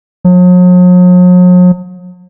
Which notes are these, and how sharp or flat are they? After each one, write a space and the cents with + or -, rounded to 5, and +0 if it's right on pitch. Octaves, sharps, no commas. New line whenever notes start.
F#3 -45